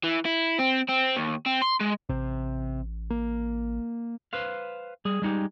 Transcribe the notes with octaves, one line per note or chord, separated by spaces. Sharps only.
E3
E4
C4
C4
D#2
C4
C6
G#3
A1 C3
A#3
B4 C5 F5
G3 G#4
G3 G#3 D#4 G4